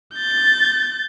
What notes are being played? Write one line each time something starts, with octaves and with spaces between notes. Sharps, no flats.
G6 A6